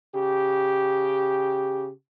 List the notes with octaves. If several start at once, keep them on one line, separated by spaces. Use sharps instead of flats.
C#3 G4